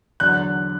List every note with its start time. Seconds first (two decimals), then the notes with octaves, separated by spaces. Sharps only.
0.20 E2 D3 F#3 F#6